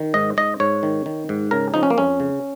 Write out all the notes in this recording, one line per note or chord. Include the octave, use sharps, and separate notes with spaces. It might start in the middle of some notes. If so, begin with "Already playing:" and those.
Already playing: D#3
G#2 D#5
G#2 D#5
G#2 C#5
D#3
D#3
G#2
C#3 A#4
F3 D#4
C#4
A#3
F2 C#4
C#3